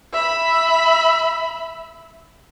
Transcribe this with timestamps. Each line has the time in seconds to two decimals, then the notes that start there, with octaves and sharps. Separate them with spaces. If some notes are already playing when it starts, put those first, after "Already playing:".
0.13 E5 B5